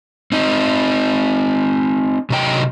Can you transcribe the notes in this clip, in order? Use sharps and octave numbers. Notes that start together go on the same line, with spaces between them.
C4 D#4
C3 F#3 D#4 D5 G5